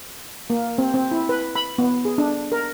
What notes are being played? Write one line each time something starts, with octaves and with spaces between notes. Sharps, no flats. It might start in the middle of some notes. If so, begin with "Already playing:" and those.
A#3
C4
C4
E4
B4
B5
B3
G#4
D4
A#4